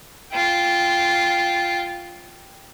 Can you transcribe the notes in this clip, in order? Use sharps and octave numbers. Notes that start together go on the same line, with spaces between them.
F4 G5